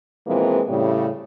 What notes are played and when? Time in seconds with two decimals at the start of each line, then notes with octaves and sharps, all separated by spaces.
0.27 B2 E3 F3 G#3 A#3 C4
0.68 A2 C#3 G3